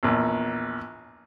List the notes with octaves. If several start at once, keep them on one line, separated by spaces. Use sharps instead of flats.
A#1 E2